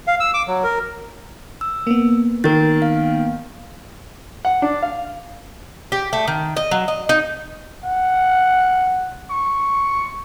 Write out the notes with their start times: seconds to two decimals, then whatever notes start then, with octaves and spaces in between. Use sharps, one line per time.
0.07 F5
0.20 E6
0.34 D6
0.48 F#3
0.64 A#4
1.61 E6
1.87 A#3 B3
2.44 D#3 A#4 A6
2.82 F5
4.45 F#5
4.62 D4
4.82 F5
5.92 G4
6.13 A3
6.28 D#3
6.57 D#5
6.71 F#3
6.88 D#5
7.09 D#4
7.84 F#5
9.30 C#6